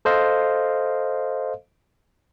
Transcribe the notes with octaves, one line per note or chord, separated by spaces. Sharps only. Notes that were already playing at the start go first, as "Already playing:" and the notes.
A4 C5 D#5 F5